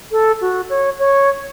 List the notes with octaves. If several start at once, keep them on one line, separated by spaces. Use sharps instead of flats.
A4
F#4
C#5
C#5